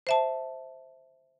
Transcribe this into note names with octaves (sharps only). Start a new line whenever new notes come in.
C5 E5 A5